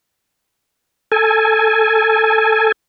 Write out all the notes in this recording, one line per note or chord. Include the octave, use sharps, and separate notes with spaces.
A4 G#5